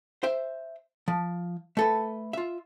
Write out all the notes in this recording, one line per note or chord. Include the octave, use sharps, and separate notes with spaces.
C5 E5 G5
F3
A3 A4 B4
F4 E5